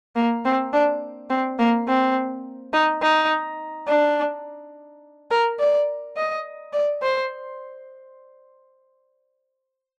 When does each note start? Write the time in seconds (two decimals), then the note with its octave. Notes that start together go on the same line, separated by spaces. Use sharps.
0.16 A#3
0.45 C4
0.73 D4
1.30 C4
1.59 A#3
1.88 C4
2.74 D#4
3.02 D#4
3.88 D4
5.31 A#4
5.60 D5
6.17 D#5
6.74 D5
7.03 C5